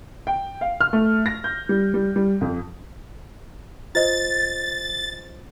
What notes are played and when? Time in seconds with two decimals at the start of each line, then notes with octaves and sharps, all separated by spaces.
0.27 G5
0.61 F5
0.81 F6
0.93 A3
1.26 A#6
1.44 G6
1.69 G3
1.94 G3
2.16 G3
2.41 F2
3.95 F4 C5 D#5 A6